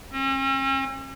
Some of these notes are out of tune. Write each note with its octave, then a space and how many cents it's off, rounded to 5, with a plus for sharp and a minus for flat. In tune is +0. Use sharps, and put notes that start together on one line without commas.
C#4 -45